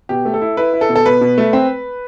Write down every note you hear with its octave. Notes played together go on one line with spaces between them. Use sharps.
B2 G4
A3
A4
E4
E4 B4
E4
A4
B2
A4
B2 B4
B2
A3
C4